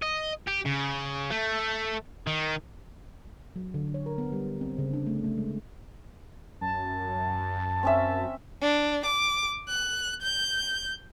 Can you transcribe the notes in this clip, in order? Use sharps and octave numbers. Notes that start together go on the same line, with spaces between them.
D#5
G4
C#3
A3
D#3
F#3
D3
C#5
A#4
B3
G3
C4
C#3
D4
A3
A3
G#3
F#2 A5
C4 C#4 E5
D4
D6
F#6
G6